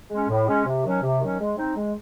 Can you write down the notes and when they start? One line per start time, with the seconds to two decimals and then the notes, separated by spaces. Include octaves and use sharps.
0.10 G#3 C#4
0.29 A2
0.47 G#3 C#4
0.66 C3
0.84 D#3 F#3 C#4
1.03 C3
1.20 D#3 F#3 C#4
1.39 G#3
1.57 C4 D#4
1.75 G#3